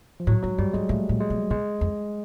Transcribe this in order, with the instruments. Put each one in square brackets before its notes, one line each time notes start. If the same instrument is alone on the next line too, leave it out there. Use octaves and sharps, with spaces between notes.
[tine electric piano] F3
[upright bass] A2 [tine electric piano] F#3
[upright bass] G#2 [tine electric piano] F#3
[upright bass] G2 [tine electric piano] G3
[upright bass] G#2 [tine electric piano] G#3
[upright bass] A2 [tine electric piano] A3
[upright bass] A#2
[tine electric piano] G#3
[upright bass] B2
[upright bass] B2 [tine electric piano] G#3
[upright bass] F2